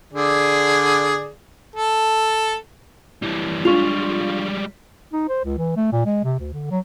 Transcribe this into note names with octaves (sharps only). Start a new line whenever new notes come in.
D3 G#4 D5
A4
E3 G3
G3 G#3 D4 F4 C#6 F7
D#4
C5
C#2
E3
A3
A#2
G#3
C3
D2
D3
F#3